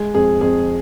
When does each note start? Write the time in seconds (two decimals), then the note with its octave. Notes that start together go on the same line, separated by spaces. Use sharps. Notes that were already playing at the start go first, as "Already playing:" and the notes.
Already playing: G#3
0.15 F2 G#4
0.41 F2 G#4